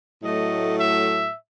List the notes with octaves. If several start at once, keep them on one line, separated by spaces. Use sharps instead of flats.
A2 F#3 A3 D#5
E5